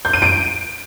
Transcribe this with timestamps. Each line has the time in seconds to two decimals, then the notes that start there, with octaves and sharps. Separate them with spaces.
0.05 G6
0.13 D#7
0.22 D7